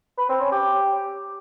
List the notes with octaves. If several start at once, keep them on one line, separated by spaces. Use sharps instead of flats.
B4
C4
C#4
G4